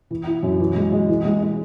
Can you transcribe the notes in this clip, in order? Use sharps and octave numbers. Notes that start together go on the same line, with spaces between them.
E3
E4
F#2
E3
G#3
G#3
E3
G#3
G#3